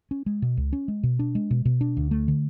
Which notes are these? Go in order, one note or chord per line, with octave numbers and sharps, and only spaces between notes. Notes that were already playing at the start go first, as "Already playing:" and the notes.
C#4
G#3
B2
C#2
C#4
G#3
B2
D4
G#3
B2
B2
D4
D2
A3
D3